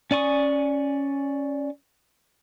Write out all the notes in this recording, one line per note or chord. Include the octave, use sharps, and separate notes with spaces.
C#4 D5 G#5 C#6 D#6